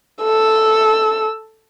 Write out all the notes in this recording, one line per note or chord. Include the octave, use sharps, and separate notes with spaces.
A4 E6